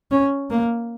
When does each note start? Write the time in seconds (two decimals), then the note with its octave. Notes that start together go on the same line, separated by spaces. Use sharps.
0.11 C#4
0.50 A#3